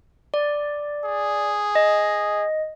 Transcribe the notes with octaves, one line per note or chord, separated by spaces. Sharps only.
D5
G#4
D#5